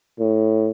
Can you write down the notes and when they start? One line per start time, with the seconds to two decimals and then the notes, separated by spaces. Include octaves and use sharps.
0.20 A2